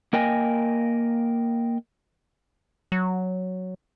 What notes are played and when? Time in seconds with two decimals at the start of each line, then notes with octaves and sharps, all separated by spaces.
0.13 A#3 A#4 D#5 G5 G#5
2.92 F#3